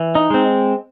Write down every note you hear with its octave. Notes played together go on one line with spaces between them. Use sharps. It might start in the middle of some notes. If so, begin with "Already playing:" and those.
Already playing: E3
D#4
G#3 C4